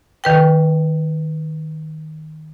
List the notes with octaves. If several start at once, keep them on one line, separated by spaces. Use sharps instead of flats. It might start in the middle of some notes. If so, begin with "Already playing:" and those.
D#3 B4 G5